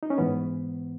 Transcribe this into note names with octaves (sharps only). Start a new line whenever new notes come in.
D#4
C#4
G#2 E3 B3